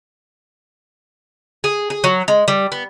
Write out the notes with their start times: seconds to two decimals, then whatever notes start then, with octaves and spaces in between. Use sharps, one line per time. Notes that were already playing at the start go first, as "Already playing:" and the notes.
1.64 G#4
1.90 G#4
2.04 F#3
2.28 G#3
2.48 G3
2.72 B3